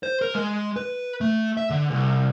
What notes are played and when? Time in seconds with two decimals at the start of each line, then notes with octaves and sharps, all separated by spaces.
0.03 C5
0.21 A#4
0.35 G#3
0.76 B4
1.21 A3
1.57 E5
1.70 D3
1.91 C2